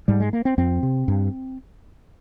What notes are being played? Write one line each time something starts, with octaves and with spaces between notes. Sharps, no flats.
G#2 G3
G#3
A#3
C4
F2 C4
C3
G2